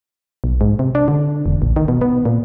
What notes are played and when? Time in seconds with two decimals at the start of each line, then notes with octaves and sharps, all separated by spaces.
0.44 B1
0.61 G#2
0.79 C3
0.95 D4
1.08 D3
1.46 E1
1.62 A#1
1.76 D#3
1.88 B2
2.01 B3
2.25 A#2